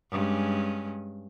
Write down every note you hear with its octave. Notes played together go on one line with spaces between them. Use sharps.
G2 G#3 C#4